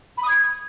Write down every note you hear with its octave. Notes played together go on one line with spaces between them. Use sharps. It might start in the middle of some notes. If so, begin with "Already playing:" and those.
B5
D#6
G#6